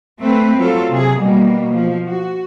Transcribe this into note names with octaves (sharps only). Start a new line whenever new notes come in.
A3 C4 B4
F#3 F4 A4
C3 G#4
B2 G3 A#3
F3
F#4